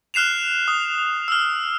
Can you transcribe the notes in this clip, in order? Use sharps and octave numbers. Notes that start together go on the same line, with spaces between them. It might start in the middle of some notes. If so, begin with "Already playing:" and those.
F6 F#6 C7 E7 F7
D#6
E6 F6